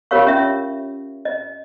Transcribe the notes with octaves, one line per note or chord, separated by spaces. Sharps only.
F4 G4 A#4 C#5 F5 C#6
C#4 F4 E5
D#5